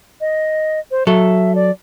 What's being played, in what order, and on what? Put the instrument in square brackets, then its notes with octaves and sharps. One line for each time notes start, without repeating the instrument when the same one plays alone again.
[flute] D#5
C5
[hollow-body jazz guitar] F#3 A4 [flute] E5
[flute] D5